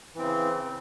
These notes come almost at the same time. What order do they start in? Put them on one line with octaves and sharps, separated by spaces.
E3 C4 C#3